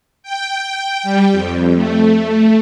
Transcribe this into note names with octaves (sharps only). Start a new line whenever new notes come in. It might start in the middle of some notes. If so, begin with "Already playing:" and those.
G5
G3
F2
A3